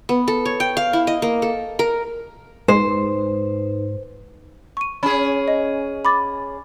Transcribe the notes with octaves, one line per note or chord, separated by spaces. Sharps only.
B3
A4
C#5
G5
F5
E4
D#5
A#3
A4
A#4
G#2 D#4 B4 C5
C#6 D#7
C#4 G#4 B5
D#5
B5 D6 A6